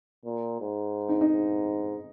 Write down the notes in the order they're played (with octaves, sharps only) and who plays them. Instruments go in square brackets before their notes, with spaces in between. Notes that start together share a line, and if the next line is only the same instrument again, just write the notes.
[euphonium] A#2
G#2
[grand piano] D#4
D#4
[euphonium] G#2